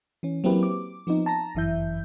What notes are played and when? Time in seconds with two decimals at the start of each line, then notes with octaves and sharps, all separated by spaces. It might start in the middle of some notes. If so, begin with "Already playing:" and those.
0.23 E3 C#4
0.44 F#3 A#3 C4 E4 G4 B4
0.63 D6
1.07 F3 B3 C4 D#4
1.26 A5 A#5 A#6
1.55 G1 F#2 E3 E4 E5 G6